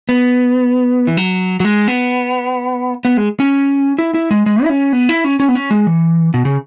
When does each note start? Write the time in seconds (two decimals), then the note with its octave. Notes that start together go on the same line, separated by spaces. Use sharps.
0.09 B3
1.07 E3
1.17 F#3
1.60 F#3
1.65 G#3
1.88 B3
3.05 B3
3.17 G#3
3.40 C#4
3.99 E4
4.14 E4
4.31 G#3
4.46 G#3
4.64 E4
4.70 C#4
4.93 B3
5.09 E4
5.24 C#4
5.40 C#4
5.49 B3
5.55 C#4
5.71 G#3
5.87 E3
6.34 B2
6.45 C#3